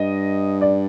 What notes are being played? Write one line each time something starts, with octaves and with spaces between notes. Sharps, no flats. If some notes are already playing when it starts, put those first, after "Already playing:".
Already playing: G2 D#5
D5